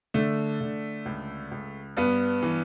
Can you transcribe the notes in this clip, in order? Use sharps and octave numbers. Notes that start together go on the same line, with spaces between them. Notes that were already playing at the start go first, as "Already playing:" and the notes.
D3 A3
D3
C#2
C#2
G2 B3
E3